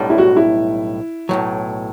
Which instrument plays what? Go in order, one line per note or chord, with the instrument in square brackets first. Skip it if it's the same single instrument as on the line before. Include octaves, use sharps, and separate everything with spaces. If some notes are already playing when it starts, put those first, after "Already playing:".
Already playing: [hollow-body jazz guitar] B1 A2 G3 D4
[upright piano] E4
F#4
E4
[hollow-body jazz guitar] B1 A2 F#3